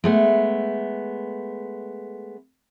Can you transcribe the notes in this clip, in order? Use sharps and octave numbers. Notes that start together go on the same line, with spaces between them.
G#3 A3 B3